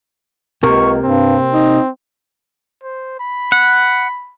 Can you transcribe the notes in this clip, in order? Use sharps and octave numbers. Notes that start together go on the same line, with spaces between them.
C#2 C3 A#3 A#4 C#6
G2 C4
D#4
C5
B5
F#5